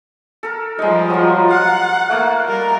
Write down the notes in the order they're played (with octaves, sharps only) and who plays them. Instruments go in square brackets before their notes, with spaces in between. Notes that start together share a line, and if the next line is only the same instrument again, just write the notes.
[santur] A4 A#4
[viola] F3 G3 [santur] G#3 D#4
[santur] F#3 F4
[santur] F5 [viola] F#5
[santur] A3 A#3 A5
[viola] G3 A#4